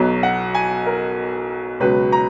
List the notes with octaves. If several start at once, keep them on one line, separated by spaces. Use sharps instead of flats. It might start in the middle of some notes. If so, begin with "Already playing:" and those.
Already playing: B1 B2 F#3
F#5
G#5
A#4
C#2 B2 F#3 B4
A#5